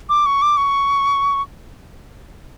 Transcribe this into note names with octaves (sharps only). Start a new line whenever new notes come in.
D6
C#6
D6
C#6